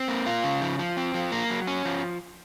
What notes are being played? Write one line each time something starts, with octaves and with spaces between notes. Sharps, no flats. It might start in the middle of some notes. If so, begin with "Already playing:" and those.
Already playing: C4
A#3
F4
C#3
F3
F3
C4
F3
A#3
F#3
C#4
F3